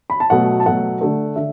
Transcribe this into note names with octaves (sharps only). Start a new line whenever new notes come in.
B5
A5
B2 F#3 A3 F#5
A5
B2 F#3 A3 F#5
D3 A3
D3 E5